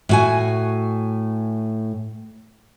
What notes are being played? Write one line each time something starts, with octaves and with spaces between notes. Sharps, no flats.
A2 F#4 G#5